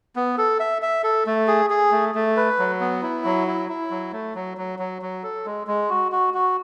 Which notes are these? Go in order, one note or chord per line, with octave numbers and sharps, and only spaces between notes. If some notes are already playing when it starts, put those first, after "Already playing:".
B3
A4
E5
E5
A4
A3
G#4
G#4
A3
A3
B4
F#3
B3
E4
F#3
E4
E4
F#3
A3
F#3
F#3
F#3
F#3
A4
G#3
G#3
F#4
F#4
F#4